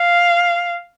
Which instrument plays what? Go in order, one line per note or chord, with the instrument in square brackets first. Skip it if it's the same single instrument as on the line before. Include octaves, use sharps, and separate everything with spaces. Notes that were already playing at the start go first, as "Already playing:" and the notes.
Already playing: [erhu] F5